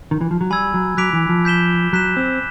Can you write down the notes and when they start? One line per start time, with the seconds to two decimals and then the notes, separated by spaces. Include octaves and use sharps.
0.11 D#3
0.21 E3
0.31 F3
0.41 F#3
0.50 G3 G#5 B5 E6 G#6
0.74 F#3
0.97 F#3 D6 F#6 B6 D7 F7
1.13 E3
1.29 F3
1.45 G6 B6 E7 G7
1.93 F#3 F#6 B6 E7
2.17 C4